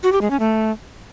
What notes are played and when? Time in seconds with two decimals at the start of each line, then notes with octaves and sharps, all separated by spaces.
0.03 F#4
0.12 G4
0.21 G#3
0.30 C#4
0.40 A3